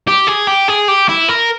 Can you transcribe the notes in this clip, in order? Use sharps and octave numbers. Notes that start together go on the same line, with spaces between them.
G4
G#4
G4
G#4
G4
E4
A#4